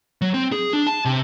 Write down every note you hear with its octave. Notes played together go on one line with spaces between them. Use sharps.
F#3
C4
G#4
D4
A5
C3